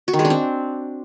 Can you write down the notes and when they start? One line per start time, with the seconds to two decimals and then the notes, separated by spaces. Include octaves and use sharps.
0.08 F#4
0.13 D#3
0.19 G#3
0.25 D4
0.30 C4